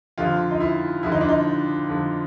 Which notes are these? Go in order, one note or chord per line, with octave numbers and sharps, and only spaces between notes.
F2 D3 F3 F4
D#4
E4
F2 D3 F3 E4
D#4
D4
D#4
F2 D3 F3